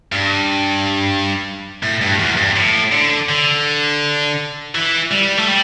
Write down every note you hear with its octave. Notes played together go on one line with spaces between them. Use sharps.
G2
A2
G2
E2
G2
A2
D3
D3
E3
G3
A3
G3